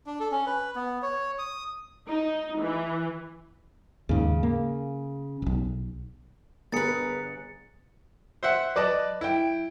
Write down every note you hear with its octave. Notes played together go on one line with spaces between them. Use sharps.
D4
A4
C#4
B4
B3
C#5
D#6
D#4
E3
D#2 G#2 C#3
A#3
D1 B1
G1 G#4 A#4 B4 D#6 A6 C#7
C5 E5 F#5
B4 D5 D#5 A5
E4 G5